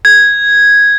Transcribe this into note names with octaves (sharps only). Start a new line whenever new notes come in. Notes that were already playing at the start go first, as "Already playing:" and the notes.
G#6